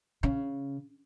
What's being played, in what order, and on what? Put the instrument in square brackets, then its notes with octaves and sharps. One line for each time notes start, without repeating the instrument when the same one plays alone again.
[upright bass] C#3